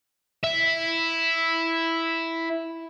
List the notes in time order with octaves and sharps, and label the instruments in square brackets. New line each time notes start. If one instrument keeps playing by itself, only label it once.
[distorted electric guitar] E4 E5